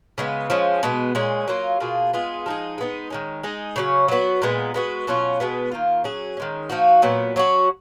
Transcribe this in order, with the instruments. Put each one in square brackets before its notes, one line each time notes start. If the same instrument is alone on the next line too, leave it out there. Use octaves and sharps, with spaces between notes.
[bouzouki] C#3 G#3 B3
F3 G#3 C#4
B2 G#3 B3
A#2 G#3 C#4 G#4
F#3 A#3 F4
B2 A#3 F4 G#4
G#3 B3 F4 G#4
F3 G#3 D#4 G#4
G#3 B3 D#4
D#3 G#3 C#4
G#3 D#4 G#4
C#3 F#3 C#4
F#3 B3 F#4
A#2 G#3 B3
G#3 B3 F#4
B2 F#3 C#4 F4
B2 G#3 B3
D#3 A#3 F4
F#3 C#4 G#4
D#3 G#3 C#4
F3 A#3 D#4 F#4
A#2 F#3 B3
F#3 C#4 F#4